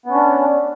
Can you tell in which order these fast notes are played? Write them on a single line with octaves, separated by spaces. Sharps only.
B3 C#4 D4